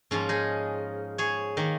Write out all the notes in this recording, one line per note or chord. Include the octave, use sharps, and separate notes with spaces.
G#2 F3 A#3 C#4 F4
D#4 G#4
G#4 C#5
D#3 A#3